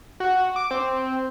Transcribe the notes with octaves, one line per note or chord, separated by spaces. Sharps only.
F#4
D6
C4